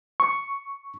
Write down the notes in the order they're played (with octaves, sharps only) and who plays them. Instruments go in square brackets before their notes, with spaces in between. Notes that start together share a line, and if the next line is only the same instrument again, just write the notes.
[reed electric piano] C#6